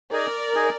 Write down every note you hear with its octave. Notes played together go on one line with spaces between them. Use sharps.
D#4 G#4 A#4 D5 D#5 G#5
D#4 G#4 D#5 G#5